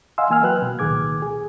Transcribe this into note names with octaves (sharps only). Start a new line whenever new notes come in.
D#5 F5 F#5 G#5 C6 E6
E3 A#3 G#5 E6 F6
F#3 F#4 B4 G5 F#6
B2
C2 A#2 D#3 G#4 D6 G#6
G#4